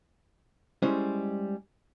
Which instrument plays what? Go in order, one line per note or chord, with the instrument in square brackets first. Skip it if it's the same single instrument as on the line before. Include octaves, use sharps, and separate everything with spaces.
[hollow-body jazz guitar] G3 G#3 C#4 E4 C5 D#5